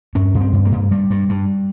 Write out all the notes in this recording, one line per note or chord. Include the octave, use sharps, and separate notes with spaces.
G2 C#4
G2
C4
G2
A#3
G2
G2 G3
G2
G2